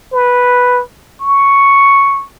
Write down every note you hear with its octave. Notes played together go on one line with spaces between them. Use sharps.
B4
C#6